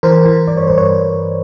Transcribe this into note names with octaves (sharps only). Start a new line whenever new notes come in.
E3 A#4 C5
E3
G2 D5
C#5
G2 C5
B4 C#5